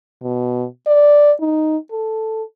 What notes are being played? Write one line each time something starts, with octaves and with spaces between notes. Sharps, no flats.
B2
D5
D#4
A4